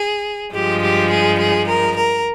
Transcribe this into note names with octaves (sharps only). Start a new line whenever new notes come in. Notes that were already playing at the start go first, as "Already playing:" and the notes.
Already playing: G#4
G2 F3 G#3 G4
G4
G#4
G#4
A#4
A#4